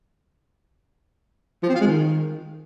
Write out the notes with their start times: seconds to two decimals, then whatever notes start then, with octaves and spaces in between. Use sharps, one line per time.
1.63 F3
1.69 C4
1.75 F4
1.81 G#3
1.87 D#3